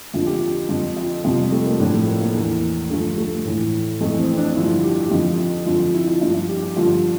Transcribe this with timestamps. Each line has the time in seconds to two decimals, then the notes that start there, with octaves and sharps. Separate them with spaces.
0.14 F2 D3 F3 F4
0.26 G4
0.39 F4
0.69 F2 D3 F3
0.97 F4
1.24 F2 C3 F3 F4
1.39 G3
1.52 A3
1.66 A#3
1.79 A2 F3 D4
1.94 A3
2.07 A#3
2.21 A#3
2.34 E2 E3
2.90 G2 D3 F3 A3
3.17 A3
3.45 A2 E3
4.01 F2 E3 A3
4.19 C4
4.32 C4
4.37 D4
4.55 G2 D3 F3 E4
4.83 G4
5.06 G4
5.11 F2 D3 F3 F4
5.38 F4
5.66 F2 D3 F3 F4
5.80 F4
5.94 E4
6.08 F4
6.21 G2 F3 F4
6.34 F4
6.49 G4
6.62 G4
6.76 G2 D3 F3 F4